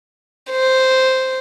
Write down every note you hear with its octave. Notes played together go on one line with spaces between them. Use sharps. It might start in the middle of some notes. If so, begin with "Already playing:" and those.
C5